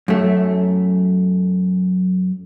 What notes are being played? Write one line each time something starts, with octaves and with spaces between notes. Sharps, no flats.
F#2 A3